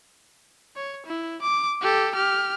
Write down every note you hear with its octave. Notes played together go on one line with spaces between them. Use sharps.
C#5
E4
D6
G4 A4
G4 F6